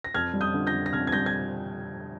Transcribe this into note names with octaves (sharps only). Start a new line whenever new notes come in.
A#6
F2 F6 G#6
G3
D#6 G6
D3
G6 A#6
F2
A#6
F2 F6 G#6
G#6
G3 G6 A#6
G#6